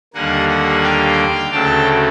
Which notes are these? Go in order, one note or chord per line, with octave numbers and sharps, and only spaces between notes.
D#2 D3 G3 A#3 F#5 G#5
F#5 G#5
F5 G5
D2 C#3 F#3 A3 G5 A5